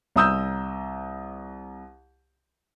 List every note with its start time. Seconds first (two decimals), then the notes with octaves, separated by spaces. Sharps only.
0.16 C2 A#5 D#6 E6 G6